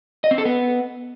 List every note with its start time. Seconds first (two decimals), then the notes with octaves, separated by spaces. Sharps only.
0.24 D#5
0.31 C4
0.38 A4
0.45 B3